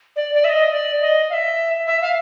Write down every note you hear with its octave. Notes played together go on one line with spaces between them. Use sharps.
D5
D5
E5
D#5
D5
D#5
F5
E5
E5
F5